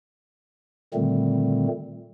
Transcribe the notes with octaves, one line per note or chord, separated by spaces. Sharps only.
A#2 D3 D#3 G3 A3 C4